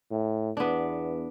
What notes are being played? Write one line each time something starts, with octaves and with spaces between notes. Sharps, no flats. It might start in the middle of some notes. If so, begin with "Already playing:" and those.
A2
E2 B3 D4